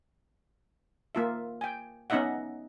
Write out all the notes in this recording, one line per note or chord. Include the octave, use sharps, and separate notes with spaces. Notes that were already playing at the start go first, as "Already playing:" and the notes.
A#3 F4 E5
G5 G#5
B3 C#4 D#4 D#5 E5 F#5